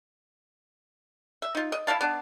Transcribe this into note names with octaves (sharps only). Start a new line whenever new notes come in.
E5
D#4 F4
D#5
E4 D#5 F5 A5
B3 D4